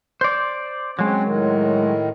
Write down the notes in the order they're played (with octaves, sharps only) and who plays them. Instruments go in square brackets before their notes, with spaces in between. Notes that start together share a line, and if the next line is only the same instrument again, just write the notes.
[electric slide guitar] C5 D5
[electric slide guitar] F#3 G#3 [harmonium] C4 C#4
[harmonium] A2 D#3